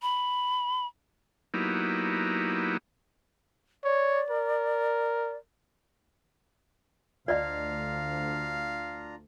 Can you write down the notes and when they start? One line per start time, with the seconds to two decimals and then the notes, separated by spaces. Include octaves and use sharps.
0.02 B5
1.54 F#3 A#3 B3 D#4 E4 G4
3.84 C#5 D5
4.30 A#4
7.28 D2 D4 F4 D5 D#5 F5 A#5